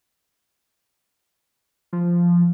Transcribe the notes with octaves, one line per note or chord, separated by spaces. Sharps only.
F3